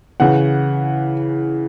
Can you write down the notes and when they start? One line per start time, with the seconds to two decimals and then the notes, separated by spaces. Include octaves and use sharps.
0.20 C#3 E3 F#5